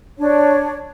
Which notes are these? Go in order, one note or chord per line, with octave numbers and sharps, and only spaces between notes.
D4 C#5